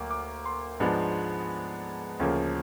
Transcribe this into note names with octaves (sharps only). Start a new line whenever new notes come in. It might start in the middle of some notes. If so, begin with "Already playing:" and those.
Already playing: D2 F#3 A#3 D6
D6
C6
G#2 F3 G#3 B3 D4
D2 C#3 F3 A#3